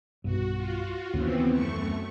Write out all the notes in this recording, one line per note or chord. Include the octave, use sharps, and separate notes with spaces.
B1 G2 F#4
F4 F#4
D#2 C#3 E3 B3 C4
F#2 A3 C#6